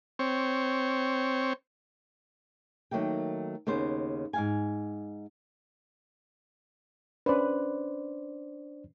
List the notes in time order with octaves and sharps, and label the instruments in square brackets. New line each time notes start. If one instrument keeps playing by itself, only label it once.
[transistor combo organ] C4 C#5
[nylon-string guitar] D#3 F#3 A3 A#3 G5
D#2 C#3 B3 C5
G#2 F5 G#5
[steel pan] C#4 B4 [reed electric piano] D4 C5 D5